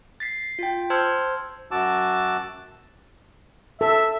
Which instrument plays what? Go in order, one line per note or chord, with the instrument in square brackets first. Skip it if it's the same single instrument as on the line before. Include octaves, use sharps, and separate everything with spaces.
[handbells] A6 B6 C7
F4 G5
C5 A5 C6 E6 F6 G#6
[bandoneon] F#2 F#4 A5 D6 E6
[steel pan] A4 [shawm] E5